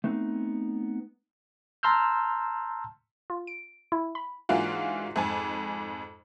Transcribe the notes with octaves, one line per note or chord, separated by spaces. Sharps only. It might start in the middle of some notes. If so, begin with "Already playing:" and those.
A3 B3 C4 D#4
A5 A#5 C6 E6 F6 G6
F4
D7
E4
B5
G#2 E3 A#3 D4 F4 F#4
F2 G#2 G#5 A5